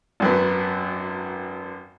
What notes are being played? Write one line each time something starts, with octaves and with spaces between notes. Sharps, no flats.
G#1 F#2 B3